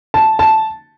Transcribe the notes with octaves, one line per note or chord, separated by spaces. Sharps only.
A5
A5